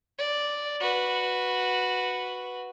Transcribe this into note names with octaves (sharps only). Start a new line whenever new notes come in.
D5
F#4 B4